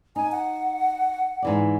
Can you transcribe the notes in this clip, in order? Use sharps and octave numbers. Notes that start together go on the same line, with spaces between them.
D#4 G#5
F#5
G#2 E3 D5